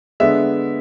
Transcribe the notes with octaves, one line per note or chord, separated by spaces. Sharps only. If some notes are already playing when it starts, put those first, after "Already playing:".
D3 G#3 B3 D4 E5